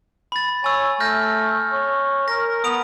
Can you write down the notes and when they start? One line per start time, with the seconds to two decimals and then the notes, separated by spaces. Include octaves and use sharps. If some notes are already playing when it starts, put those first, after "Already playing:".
0.32 B5 A6
0.64 C#5 G#5 E6
1.00 A3 F6 G6 A#6
1.72 C#5
2.28 A#4 A#6
2.64 B3 D#6 D7 F7